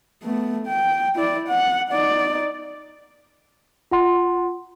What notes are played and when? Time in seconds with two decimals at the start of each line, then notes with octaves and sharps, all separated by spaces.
0.24 A3 B3
0.67 G5
1.16 E4 D5
1.48 F#5
1.90 D#4 D5
3.91 F4 F#5 C6